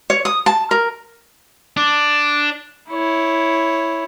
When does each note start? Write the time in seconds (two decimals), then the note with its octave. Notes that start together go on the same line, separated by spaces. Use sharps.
0.10 C#5
0.25 D#6
0.46 A5
0.71 A#4
1.77 D4
2.90 E4 C#5